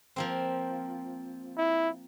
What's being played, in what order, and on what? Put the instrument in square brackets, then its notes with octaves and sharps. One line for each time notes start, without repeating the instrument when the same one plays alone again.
[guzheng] F3 A#3 C4
[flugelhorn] E4